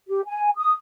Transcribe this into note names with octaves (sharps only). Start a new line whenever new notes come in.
G4
G#5
D#6